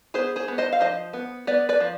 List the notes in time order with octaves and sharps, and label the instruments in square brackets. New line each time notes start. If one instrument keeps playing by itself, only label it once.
[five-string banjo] B3 G#4 C5
G#4 C5
B3
C5 D#5
F5
F3 C5 D#5
B3
B3 B4 D5
B4 D5
F3